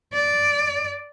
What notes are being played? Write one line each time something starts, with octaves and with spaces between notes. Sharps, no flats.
D5